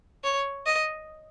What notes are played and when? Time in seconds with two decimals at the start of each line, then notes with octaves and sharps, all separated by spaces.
0.24 C#5
0.66 D#5